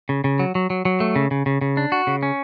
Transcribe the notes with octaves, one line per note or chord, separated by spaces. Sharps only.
C#3
C#3
F#3
F#3
F#3
F#3
A3
C#3
C#3
C#3
C#3
D4
F#4
C#3
C#4